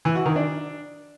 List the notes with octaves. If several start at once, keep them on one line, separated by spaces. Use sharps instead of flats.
E3
F#4
D#3
D4